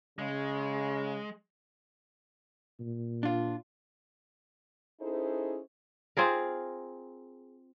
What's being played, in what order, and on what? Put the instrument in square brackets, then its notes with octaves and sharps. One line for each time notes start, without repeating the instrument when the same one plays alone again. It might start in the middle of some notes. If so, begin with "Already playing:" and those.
[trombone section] C#3 [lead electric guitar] G#3
[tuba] A#2
[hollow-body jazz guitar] D4 F4
[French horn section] C#4 D#4 E4 G#4 A4 C5
[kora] C4 F4 G#4 A#4